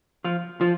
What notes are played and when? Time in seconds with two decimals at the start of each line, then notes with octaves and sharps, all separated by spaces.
0.24 F3 F4
0.61 F3 F4